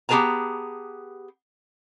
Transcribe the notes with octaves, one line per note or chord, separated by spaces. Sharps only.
B3 G4 G#4 B4 A5 A#5